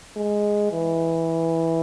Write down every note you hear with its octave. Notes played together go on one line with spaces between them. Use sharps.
G#3
E3